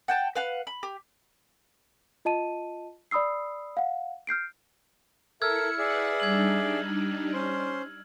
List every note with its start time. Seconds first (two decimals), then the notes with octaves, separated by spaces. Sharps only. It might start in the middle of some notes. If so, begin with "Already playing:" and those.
0.08 F#5 G5 A5
0.35 B4 F5 F#5
0.67 B5
0.83 G4
2.25 F4 D#5 A5 D#7
3.11 D5 B5 D#6 E6 C7
3.77 F5 F#5
4.27 F6 G6 C7 D7
5.42 E4 A4 A#4 E5 E6 F6 G#6 C#7
5.78 G#4 B4 D5 E5 F#5
6.20 G3 D4 D#4 G#6 F#7
7.34 C#4 C5 C6